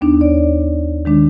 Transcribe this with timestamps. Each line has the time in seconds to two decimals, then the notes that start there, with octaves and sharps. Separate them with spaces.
0.01 D#2 B3 D4 D#4
0.21 C#5 D5
1.05 D#3 G#3 D4